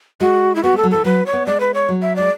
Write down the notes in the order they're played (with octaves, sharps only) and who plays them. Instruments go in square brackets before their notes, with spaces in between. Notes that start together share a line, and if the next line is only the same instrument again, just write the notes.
[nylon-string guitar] G#3 [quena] F#4
[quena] E4
[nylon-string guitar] B3 [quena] F#4
[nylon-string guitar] G#3 [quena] A4
[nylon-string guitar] F#3
[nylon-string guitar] E3 [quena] A4
[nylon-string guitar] F#3 [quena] B4
[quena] C#5
[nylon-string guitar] B3
[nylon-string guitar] G#3 [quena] D5
[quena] B4
C#5
[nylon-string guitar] F#3
[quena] E5
[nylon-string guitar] G#3 [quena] D5